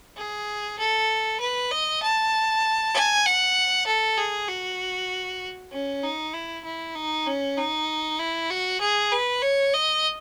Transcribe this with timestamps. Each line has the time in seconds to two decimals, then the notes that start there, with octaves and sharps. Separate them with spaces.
0.17 G#4
0.79 A4
1.40 B4
1.71 D#5
2.02 A5
2.94 G#5
3.26 F#5
3.87 A4
4.18 G#4
4.48 F#4
5.72 C#4
6.03 D#4
6.34 E4
6.65 E4
6.95 D#4
7.27 C#4
7.58 D#4
8.19 E4
8.50 F#4
8.81 G#4
9.12 B4
9.42 C#5
9.74 D#5